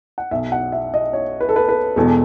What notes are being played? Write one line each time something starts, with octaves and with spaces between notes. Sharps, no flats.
F#5
B1 B2 E5
F#5
E5
D#5
C#5
B4
A4
B4
B4
E1 E2 B2 A4